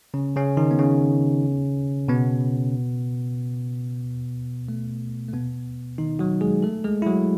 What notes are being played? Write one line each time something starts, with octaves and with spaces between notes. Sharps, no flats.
C#3 C#4
C#3 C#4
D#3 D#4
B3
C#3 C#4
B2 B3
A3
A3
B2 B3
D#3 D#4
F#3 F#4
G#3 G#4
A3 A4
G#3 G#4
E4
F#3 F#4